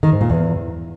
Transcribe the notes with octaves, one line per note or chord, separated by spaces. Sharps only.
D#3
G#2
A#2
E2